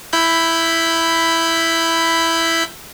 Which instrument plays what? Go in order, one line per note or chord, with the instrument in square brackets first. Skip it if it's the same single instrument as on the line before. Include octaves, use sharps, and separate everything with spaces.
[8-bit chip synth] E4 B5 G6